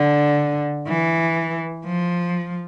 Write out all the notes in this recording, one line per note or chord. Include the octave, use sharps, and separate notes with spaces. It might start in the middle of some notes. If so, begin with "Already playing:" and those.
Already playing: D3
E3
F3